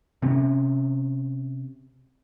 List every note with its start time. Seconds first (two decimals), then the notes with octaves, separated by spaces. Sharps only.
0.22 C3 C4 C#4